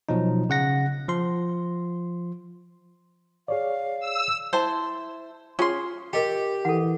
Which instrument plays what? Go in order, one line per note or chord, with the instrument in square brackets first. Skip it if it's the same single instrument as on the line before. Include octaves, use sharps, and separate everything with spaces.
[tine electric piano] B2 F3 F#3 D#4
C#3 F#5 A#6
F3 C6
[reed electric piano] G#4 C#5 D5 [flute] F5
[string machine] E6
[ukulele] E4 A5 [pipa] C5
[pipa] C#4 C6 [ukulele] F4 G#4
[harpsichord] G4 [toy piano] A#4 D#5 G5
[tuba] E3 [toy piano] A4 F#5